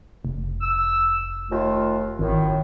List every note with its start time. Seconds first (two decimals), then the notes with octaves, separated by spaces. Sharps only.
0.25 F1
0.61 E6
1.51 D#2 A3 F4
2.19 G#1 F#2 A2 D#3